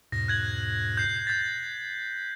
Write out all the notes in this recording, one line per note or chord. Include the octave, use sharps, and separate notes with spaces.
E2 G#2 B2 A#6
F#6 G#6 F#7
G6 C7
G6 A6 B6